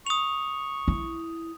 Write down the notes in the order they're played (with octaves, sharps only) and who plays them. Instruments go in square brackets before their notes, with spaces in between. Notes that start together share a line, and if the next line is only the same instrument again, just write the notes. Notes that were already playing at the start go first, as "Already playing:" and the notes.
[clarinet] C#6 [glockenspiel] D#6 F7
[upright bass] E4